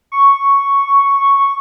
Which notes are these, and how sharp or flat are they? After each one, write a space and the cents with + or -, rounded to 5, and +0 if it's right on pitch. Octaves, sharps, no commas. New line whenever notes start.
C#6 +0